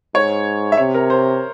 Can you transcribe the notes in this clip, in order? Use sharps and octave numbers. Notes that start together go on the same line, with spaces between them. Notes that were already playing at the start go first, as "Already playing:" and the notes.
G#2 C#5
E5
C3 C#5
A#4
C5